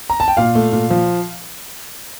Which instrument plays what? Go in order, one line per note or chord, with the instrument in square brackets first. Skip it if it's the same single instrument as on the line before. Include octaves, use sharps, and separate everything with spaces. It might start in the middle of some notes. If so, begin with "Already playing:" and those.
[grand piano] A#5
A5
G5
A#2 F5
A3
A#2
F3